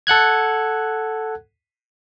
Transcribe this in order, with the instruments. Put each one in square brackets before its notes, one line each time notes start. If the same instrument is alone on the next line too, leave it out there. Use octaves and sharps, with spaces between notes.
[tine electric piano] A4 F#5 F#6 G#6